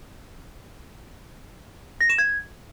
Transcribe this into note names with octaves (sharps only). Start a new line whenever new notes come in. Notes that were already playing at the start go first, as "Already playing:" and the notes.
A#6
E7
G#6